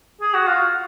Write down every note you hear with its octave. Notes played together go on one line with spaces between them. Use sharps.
G#4
F#4
F4